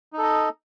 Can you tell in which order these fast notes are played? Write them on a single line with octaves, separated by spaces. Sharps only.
D#4 A4 D#5